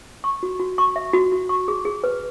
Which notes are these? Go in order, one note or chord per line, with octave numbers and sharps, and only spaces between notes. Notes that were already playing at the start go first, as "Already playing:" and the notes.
C#6
F#4
F#4
C#6
E5
F#4
F#4
C#6
G#4
G#4
B4